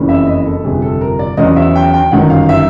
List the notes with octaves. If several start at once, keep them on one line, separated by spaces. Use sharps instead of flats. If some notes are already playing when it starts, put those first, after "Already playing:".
Already playing: F#1 F2 C#3 E3
E5
D#5
A4
G1 F2 C3 G#4
A4
A#4
D5
E2 C#3 F#3 D#5
E5
G5
G5
G1 F#2 D#3 F#5
F5
E5